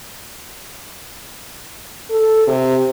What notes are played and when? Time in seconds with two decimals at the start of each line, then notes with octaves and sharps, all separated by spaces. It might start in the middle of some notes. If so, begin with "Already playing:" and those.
2.10 A4
2.47 C3